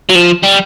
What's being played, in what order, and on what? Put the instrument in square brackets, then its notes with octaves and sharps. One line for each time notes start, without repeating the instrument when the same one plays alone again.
[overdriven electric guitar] F#3
F3
G3